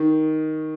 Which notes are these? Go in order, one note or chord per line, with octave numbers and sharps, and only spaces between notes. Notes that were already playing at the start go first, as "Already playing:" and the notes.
Already playing: D#3